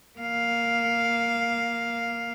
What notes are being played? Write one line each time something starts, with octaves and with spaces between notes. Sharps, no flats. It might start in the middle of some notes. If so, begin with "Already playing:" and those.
A#3 F5